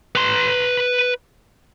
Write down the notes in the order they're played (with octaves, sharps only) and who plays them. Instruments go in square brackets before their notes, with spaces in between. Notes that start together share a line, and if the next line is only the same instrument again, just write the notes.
[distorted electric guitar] B4 C6